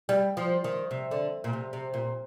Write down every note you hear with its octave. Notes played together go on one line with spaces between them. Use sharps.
G3
F3
D#3
C3
D3
A#2
C3
C3
A#2